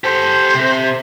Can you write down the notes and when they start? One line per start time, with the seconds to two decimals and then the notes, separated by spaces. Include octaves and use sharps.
0.04 G4 A4 C5
0.55 C3